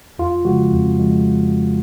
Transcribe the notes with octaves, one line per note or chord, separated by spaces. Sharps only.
F2 F4
C#3 F3 G#3 F#4
F2
C#3 F3 G#3